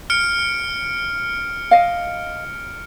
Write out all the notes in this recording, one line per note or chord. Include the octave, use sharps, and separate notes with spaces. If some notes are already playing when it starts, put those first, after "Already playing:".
F6 C#7 D7
D#5 F5